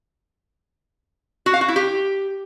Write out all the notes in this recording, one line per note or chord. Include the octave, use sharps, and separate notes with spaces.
F#4
F5
F#4
E4
G4